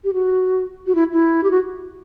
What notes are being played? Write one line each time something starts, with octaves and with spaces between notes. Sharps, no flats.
G4
F#4
F#4
E4
E4
G4
F#4